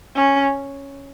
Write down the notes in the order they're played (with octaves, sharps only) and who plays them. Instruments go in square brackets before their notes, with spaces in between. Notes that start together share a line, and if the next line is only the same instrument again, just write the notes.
[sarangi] C#4